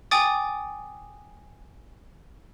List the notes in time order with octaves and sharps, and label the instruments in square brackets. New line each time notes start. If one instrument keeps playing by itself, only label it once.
[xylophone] G5 G#5 D6 D#6 A6